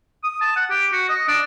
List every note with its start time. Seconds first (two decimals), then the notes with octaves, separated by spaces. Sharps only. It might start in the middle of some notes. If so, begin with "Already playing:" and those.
0.23 D#6
0.41 A5
0.56 F#5
0.70 G4
0.92 F#4
1.09 D#5
1.28 D4